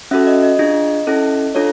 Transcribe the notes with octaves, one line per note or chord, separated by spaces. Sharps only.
C#4 F#4 A4 E5
D#5
D#5
D4 F4 G#4
C#4 E4 A4
D4 F4 A4 C#5